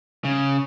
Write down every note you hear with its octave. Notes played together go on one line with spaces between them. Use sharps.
C#3